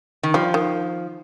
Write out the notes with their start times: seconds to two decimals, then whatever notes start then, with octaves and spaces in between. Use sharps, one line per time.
0.23 D#3
0.34 F3 G3
0.54 D#3